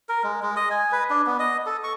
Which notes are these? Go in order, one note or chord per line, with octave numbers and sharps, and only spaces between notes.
A#4
G#3
G#3
D#5
G#5
B4
D4
B3
D#5
A4
C#6